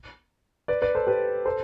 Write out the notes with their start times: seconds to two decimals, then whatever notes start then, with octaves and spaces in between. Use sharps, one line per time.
0.68 B4 D5
0.82 B4 D5
0.95 A4 C5
1.07 G4 B4
1.45 A4 C5